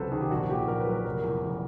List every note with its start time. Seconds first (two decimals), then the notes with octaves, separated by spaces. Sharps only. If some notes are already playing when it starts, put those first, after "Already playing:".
Already playing: C#2 C3 F#3 A4 B4 C5
0.12 D#3 G#4
0.21 G4
0.30 A#1 F#4
0.49 A#2 G4
0.68 A#1 A#4
0.80 B4
0.86 F#3
0.92 A#4
1.06 F1 A#4
1.24 E2
1.42 F1